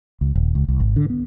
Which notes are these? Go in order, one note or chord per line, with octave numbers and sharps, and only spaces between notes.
C#2
D#1
C#2
C2
G#1
D3
B3